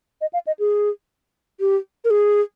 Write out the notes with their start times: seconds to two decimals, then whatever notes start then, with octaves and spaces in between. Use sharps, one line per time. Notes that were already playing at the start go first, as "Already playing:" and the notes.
0.21 D#5
0.33 F5
0.47 D#5
0.59 G#4
1.60 G4
2.05 A#4
2.10 G#4